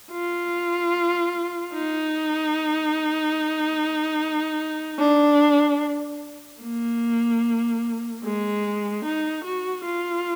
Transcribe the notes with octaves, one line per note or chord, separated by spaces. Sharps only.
F4
D#4
D4
A#3
G#3
D#4
F#4
F4